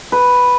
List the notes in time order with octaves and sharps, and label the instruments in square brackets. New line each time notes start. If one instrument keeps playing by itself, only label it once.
[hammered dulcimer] B4